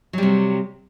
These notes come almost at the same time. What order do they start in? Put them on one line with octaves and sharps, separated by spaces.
F#3 G3 C3